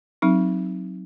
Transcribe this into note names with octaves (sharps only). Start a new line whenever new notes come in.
F#3 C4 D#4